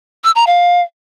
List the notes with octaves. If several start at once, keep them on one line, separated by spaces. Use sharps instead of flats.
E6
A#5
F5